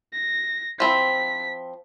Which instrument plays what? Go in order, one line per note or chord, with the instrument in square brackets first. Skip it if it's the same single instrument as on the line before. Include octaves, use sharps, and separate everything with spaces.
[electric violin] A#6
[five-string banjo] F3 C4 E4 [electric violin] B6